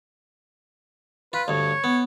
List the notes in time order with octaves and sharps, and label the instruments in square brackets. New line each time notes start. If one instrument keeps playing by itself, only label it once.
[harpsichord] F4 [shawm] B4
[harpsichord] D2 G2 [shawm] C#5
[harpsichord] B3